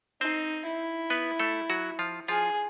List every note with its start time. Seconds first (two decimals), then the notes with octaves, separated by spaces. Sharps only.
0.21 C4 D#4 C5
0.66 E4
1.10 B3 B4
1.40 A3 A4
1.70 F#3 F#4
1.99 F3 F4
2.28 F3 F4 G#4